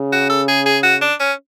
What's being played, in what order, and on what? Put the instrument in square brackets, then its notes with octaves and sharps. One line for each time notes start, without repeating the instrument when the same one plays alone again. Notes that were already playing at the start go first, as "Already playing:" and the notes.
Already playing: [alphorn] C#3
[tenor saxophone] F#4
A4
G#4
G#4
F#4
D4
C#4